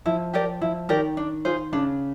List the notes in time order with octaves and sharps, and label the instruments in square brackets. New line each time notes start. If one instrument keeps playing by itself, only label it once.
[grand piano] F3 [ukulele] E4
[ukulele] G4 A#4 D5
[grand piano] F3 [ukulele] E4
[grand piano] D#3 [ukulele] G4 A#4 D5
[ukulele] D4
F4 G#4 C5
[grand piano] C#3 [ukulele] D4